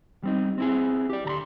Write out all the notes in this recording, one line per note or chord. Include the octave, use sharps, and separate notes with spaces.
G3 C4 D#4
C4 E4 G#4
G4 D5
D2 A#5 C6